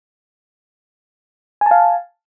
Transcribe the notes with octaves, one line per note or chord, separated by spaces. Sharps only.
F5 G#5 A5